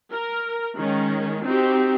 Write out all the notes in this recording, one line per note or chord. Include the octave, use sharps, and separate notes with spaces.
A#4
D#3 G#3 C#4
C4 D#4 F#4 G4